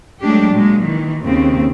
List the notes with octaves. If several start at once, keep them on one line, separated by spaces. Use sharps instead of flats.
F#3 G#3 A3 D4 G4
A#2 F#3 G#3
D#3 E3
D#2 C#3 C4